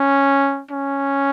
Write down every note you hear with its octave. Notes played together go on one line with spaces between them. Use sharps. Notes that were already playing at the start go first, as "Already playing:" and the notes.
Already playing: C#4
C#4